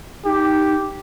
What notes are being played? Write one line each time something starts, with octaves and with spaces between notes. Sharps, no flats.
D#4 G4